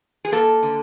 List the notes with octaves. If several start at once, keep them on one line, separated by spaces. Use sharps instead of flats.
G#4
A#3 A4
D3